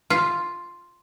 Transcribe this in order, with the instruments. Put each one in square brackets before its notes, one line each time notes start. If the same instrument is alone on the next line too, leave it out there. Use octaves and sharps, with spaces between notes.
[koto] F4